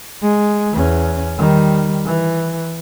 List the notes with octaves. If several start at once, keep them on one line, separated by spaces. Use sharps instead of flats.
G#3
E2 C#4
D#3 G3
E3